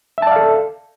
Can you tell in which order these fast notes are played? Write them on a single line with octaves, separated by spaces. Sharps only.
E5 A5 D5 F5 A4